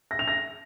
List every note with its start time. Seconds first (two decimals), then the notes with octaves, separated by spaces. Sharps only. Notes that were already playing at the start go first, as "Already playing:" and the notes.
0.11 A#6
0.19 F7
0.28 A#6